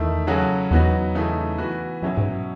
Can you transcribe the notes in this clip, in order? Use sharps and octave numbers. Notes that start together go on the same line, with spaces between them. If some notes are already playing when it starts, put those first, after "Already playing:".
Already playing: E2 D#3 A3 E4
C#3 F#3 C#4 F#4 A4
E2 F#3 B3 D#4 F#4
C#3 E3 A3 D#4
E3 B3 F#4
F#2 B2 F#3 C#4 E4
G#2